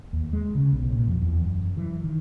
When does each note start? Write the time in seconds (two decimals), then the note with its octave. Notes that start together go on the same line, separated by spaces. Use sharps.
0.13 D#2
0.33 G#3
0.55 C#3
0.73 B1
0.92 A#2
1.07 F2
1.22 E2
1.45 F#2
1.77 E3
2.03 D#3